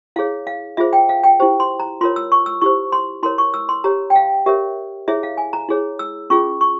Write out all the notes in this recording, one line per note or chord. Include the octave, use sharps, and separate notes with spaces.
E4 G#4 C#5 F5
F5
F4 G#4 C5 E5
G5
F5
G5
E4 G4 C5
C6
A#5
F4 A#4 C#5 C6
E6
C#6
E6
E4 G4 C5 C#6
C6
E4 A#4 C#5 C6
C#6
E6
C6
G4 C#5 A#5
G5
F5
G4 A#4 C#5 E5
E4 G#4 C#5 E5
F5
G#5
A#5
E4 G#4 C#5
E6
C#4 F4 G#4 C#6
C#6